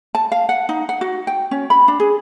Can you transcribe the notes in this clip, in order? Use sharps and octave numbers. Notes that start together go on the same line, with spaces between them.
A5
F5
F#5
D#4
F#5
F#4
G5
C#4
B5
D4
G#4